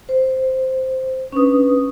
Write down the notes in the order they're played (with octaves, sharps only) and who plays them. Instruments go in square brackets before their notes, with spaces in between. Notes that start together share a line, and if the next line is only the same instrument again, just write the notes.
[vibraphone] C5
C#4 D4 B4 D#6